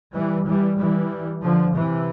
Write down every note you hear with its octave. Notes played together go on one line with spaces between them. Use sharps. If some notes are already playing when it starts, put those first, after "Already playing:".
E3 G3
E3 G3
E3 G3
D3 F3
C3 E3